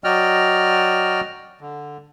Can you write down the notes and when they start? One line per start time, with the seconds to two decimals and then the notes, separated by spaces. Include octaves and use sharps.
0.04 F#3 F#4 D5 D#5 G5 F6
1.61 D3